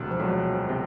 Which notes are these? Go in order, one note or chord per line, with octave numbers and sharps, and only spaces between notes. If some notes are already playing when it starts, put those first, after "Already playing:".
Already playing: E1 D2 C3
F3
E1 F#3
C3